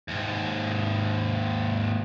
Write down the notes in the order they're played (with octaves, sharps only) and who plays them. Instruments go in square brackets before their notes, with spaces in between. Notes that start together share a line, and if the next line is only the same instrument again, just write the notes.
[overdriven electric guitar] D#2 G#2